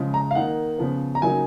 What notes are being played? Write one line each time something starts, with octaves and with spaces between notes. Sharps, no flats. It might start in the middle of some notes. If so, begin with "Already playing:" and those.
Already playing: C#3 F3 G#3
A#5
F5
D#3 A#3 D#4 F#5
C#3 F3 B3
A#5
C#3 F#3 A#3 D#4 G#5